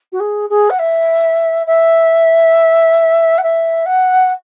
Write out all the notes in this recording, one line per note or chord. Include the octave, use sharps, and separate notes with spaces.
F#4
G#4
G#4
F#5
E5
E5
F#5
E5
F#5